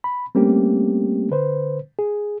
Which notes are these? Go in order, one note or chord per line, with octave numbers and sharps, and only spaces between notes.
B5
G3 A3 A#3 C4 C#4 G4
D3 B4 C5
G#4